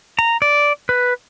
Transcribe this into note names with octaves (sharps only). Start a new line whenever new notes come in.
A#5
D5
B4